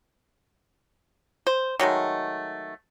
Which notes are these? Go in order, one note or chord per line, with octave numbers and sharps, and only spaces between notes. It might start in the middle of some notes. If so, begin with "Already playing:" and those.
C5
D#3 F#3 G#3 A3